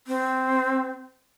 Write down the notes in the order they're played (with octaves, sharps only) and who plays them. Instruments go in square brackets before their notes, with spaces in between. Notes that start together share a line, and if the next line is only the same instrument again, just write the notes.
[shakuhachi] C4